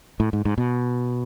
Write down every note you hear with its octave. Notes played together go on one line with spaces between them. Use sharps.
A2
G#2
G#2
B2